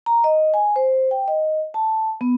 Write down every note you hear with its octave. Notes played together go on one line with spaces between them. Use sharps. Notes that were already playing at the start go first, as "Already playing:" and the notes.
A#5
D#5
G#5
C5
G5
D#5
A5
B3